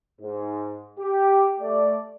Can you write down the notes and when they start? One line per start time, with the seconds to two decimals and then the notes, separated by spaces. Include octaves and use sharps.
0.21 G#2
0.99 G4
1.60 A3 D5